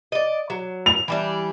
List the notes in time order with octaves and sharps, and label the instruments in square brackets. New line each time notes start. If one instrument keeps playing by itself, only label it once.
[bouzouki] D5 D#5
F#3
[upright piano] F7
[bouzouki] E3 G3 D4